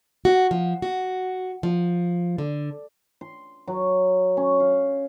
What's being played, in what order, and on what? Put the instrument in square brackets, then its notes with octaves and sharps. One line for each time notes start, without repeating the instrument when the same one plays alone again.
[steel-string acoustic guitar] F#4
F3
F#4
F3
D3
[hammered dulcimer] C6
F#3
C#4
F5